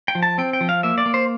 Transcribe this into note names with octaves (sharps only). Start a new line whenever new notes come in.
G5
F3
A5
C4 G5
G5
F3
F5
A#3 E5
D5
A#3
C5